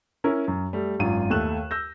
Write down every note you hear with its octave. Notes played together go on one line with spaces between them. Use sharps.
C#4 E4 A#4
F#2
G3 A3
G#1 F#2 F4 D#7
D#2 A3 F#6 E7
E6 G6 A#6